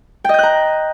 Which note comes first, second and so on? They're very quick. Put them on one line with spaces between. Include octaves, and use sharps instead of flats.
G5 D#5 G6 F#6 A#5